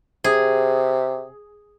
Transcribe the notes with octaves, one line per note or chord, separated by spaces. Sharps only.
C3 G#4